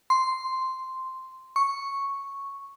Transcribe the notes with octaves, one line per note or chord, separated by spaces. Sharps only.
C6
C#6